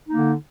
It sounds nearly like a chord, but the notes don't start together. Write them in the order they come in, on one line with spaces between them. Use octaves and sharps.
D#4 A#3 D3